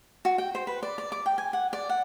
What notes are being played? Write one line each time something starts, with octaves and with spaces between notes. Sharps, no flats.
F#4
G5
C5
B4
D5
D5
D6
G5
G#5
F#5
D5
F#5